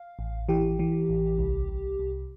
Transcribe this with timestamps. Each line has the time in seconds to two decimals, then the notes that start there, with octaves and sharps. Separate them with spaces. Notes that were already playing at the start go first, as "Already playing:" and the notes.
Already playing: F5
0.19 A1
0.49 E3 G4
0.79 E3
1.09 A1
1.39 C2
1.69 C2
1.99 C2